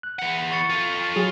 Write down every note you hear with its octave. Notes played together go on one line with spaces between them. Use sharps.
F#6
E3 F#5
C#6 A6 C#7
F4 A4
F#3 F#4 G#4